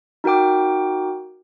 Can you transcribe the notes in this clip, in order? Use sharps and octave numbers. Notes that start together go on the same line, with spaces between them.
D#4 F#4 A#4 G5 D6